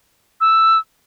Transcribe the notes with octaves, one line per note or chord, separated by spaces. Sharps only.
E6